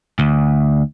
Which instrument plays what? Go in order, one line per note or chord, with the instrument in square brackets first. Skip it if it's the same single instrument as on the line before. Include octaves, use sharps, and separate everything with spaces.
[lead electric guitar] D2